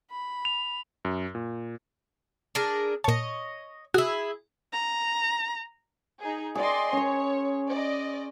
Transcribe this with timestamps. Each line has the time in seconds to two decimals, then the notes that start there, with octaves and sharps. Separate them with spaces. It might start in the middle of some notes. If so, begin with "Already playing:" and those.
0.11 B5
0.45 F7
1.05 F#2
1.35 A#2
2.55 D4 G#4 A#4
3.04 A#2 C#5 D#5 A5
3.94 E4 F#4 G#4
4.73 A#5
6.20 D#4 G#4
6.55 G#4 D5 D#5 G5 C6
6.93 C#4 C5 C#5
7.70 D5 D#5